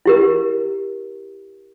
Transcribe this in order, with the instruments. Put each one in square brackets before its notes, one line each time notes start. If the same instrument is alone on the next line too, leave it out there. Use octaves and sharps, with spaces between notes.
[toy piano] E4 G4 A#4